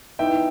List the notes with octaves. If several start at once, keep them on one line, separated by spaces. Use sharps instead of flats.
E3 B3 D#4 E5 G5